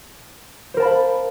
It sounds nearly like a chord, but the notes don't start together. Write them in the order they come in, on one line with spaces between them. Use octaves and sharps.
C5 A#4 A5 B5 F5